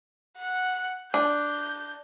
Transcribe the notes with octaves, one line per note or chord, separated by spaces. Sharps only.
F#5
D4 G6